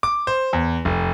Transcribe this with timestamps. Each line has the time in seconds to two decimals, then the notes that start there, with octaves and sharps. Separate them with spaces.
0.03 D6
0.27 C5
0.53 E2
0.85 F1